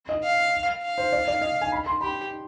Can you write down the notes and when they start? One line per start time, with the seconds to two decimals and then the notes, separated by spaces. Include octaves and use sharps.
0.09 D#5
0.23 F5
0.83 F5
0.98 C5
1.13 D5
1.28 D5
1.41 D#5
1.61 G#5
1.72 B5
1.86 C6
2.01 G4 B5